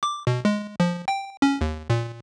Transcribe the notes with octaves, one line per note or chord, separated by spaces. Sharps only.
D6
B2
G#3
F3
G5
C#4
D#2
A#2